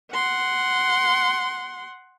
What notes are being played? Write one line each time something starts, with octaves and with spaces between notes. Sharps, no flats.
F#5 C6